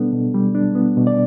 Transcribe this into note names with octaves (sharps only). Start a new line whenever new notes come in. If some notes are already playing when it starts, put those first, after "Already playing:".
Already playing: B2 G3 B3 D4 A4
B2
G3
D4
B3
B2
D5